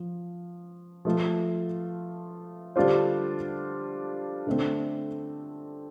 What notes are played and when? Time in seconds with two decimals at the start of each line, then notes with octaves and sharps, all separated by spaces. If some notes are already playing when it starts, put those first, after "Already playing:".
Already playing: F3
1.05 F3 A3 F4
2.76 D3 G3 D4 F4 C5
4.47 D3 A3 C4